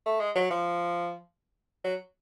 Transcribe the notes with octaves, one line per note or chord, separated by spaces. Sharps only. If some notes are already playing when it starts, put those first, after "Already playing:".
A3
G#3
F#3
F3
F#3